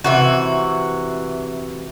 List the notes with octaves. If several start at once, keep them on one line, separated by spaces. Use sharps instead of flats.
C3 E3 F#4